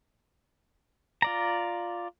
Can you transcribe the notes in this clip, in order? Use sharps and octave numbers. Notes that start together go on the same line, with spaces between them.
F4 D5 A#5